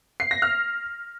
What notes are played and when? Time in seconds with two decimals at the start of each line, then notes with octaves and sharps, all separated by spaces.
0.20 C7
0.31 A#6
0.42 F6